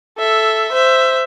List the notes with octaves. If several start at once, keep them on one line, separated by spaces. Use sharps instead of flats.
A4 E5
C5 E5